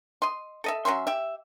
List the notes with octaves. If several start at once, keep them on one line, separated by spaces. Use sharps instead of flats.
D#5 C6
A4 D#5 E5
F#3 C#4 E5 C6
G4 E5